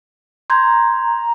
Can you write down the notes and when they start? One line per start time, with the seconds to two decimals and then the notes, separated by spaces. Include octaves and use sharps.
0.50 A#5 C6 G6 G#6